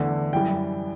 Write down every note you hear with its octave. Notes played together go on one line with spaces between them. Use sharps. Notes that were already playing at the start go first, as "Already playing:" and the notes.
Already playing: E2 D3 A3
F#2 E3 G3 G5